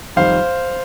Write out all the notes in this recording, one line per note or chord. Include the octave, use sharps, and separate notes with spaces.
F2 D#3 G3 C5 F5